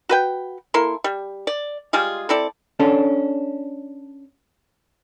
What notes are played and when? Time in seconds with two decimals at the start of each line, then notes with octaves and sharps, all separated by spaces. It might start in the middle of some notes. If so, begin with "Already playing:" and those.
0.09 F#4 B4 G5
0.74 A#3 E4 A4 C6
1.04 G3
1.47 D5
1.93 G3 G#3 F4 G#4
2.29 C4 E4 A4 D5
2.79 C#4 D4 A4